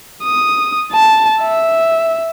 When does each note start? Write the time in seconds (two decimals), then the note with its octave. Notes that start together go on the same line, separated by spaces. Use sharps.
0.23 D#6
0.93 A5
1.42 E5